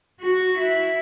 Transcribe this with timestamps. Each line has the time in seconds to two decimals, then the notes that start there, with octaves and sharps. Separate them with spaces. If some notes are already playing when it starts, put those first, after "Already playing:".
0.20 F#4
0.58 E4